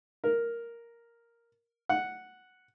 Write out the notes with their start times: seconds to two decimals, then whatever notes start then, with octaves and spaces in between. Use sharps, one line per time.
0.24 A#4
1.89 F#5